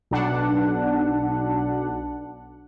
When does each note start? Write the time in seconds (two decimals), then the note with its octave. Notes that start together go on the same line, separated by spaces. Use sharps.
0.11 B1 D4 F#5